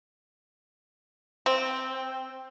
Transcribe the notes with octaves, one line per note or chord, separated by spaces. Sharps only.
C4